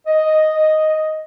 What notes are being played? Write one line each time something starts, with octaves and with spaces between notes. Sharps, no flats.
D#5